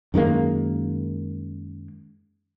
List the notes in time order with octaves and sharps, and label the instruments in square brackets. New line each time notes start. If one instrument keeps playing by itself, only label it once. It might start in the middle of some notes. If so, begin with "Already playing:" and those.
[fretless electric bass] F#2 D#3 G#3 A#3